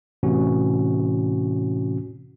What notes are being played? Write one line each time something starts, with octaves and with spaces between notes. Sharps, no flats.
A2 C3 E3 C#4 F#4